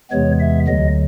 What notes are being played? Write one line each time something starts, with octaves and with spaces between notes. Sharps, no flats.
E2 C3 E3 G#3 B3 C#5
E5
D2 D3 F#3 D#5